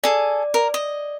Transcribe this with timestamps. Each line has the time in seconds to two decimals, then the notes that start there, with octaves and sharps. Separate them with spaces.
0.04 G#4 A4 D5
0.54 A#4
0.74 D#5